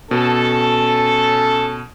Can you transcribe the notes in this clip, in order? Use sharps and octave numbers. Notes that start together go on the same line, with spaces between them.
B2 C#4 A4